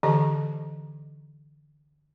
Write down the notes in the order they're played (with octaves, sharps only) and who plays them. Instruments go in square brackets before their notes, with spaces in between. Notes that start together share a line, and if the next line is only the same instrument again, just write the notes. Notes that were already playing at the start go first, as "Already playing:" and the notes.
[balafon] D3 E3 G4 D5 D#5 A5